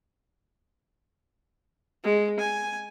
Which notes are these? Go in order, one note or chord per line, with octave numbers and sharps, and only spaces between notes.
G#3
G#5